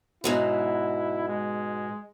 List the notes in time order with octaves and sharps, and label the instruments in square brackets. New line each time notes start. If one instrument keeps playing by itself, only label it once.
[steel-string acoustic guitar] G#2 B2 F#3 [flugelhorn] E4
[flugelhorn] G#3